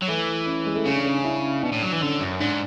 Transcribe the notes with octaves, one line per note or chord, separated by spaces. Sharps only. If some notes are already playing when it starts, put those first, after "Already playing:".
F#3
E3 A3
C#4
G#3
A3
C#3 C#4
D4
C#4
D4
E4
B2 D4
A2
F#3
E3
D3 C#4
F#2
G#2 D4